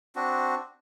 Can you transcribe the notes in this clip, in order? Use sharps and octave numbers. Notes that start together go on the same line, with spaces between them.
C4 D4 F#4